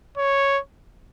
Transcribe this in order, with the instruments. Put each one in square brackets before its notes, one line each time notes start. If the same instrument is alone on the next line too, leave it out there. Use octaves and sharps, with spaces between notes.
[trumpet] C#5